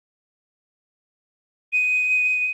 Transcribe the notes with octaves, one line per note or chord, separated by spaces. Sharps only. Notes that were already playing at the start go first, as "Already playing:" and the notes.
D#7